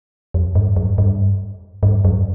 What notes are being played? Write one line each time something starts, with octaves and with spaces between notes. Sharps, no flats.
F2
G2
F#2
G2
G2
F#2